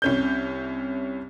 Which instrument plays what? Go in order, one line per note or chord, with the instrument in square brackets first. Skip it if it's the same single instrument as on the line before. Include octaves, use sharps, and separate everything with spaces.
[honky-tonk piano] C2 C#4 G6